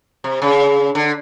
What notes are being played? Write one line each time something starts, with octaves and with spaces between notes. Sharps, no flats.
C3
C#3
D3